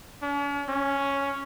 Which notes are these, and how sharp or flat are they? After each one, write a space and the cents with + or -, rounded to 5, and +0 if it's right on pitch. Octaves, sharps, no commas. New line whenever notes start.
C#4 +45
C#4 +0